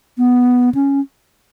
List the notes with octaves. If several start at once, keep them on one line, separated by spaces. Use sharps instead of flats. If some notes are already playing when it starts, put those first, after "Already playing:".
B3
C#4